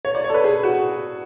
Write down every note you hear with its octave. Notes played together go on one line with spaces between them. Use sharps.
C#5
D5
C#5
A4
B4
G#4
F#4